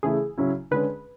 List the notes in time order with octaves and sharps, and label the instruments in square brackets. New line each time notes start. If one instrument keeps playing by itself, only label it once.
[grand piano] C#3 E3 A3 E4 [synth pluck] G#4
[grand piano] C#3 F#3 C#4 E4
[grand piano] D3 G#3 C#4 G#4 [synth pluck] B4